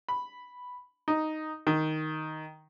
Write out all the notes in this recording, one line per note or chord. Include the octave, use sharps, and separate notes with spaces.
B5
D#4
D#3